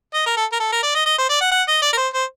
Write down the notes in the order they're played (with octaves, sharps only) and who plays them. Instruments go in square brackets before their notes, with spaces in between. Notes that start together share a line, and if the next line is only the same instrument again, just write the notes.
[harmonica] D#5
A#4
A4
A#4
A4
A#4
D5
D#5
D#5
C5
D5
F#5
F#5
D#5
D5
A#4
C5
C5